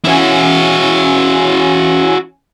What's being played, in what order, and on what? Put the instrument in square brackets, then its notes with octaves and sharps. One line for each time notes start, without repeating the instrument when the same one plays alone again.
[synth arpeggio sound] E3 C#4 G#5 [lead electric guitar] E4 F#4